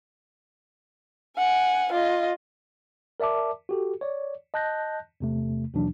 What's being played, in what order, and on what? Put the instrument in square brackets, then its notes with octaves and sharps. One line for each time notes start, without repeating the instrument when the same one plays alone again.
[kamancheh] F#5 G#5
F4 D#5
[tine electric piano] A#4 D5 E5 A5 D6
F#4 G4 A4
C#5 D5
D#5 A5 F#6 G6 A#6
E2 C3 A3
D#2 B2 E3 F#3 D4